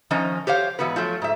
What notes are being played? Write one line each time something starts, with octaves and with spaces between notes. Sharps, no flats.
D#3 F3 C#4 D#4 D#5
G4 C5 C#5 F5
G#2 E3 B3 F#4 B4
F3 F#3 A3
G#2 E5